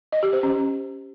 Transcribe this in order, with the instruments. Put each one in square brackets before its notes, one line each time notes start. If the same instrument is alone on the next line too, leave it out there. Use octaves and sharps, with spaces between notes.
[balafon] D#5
G4
C5
C#4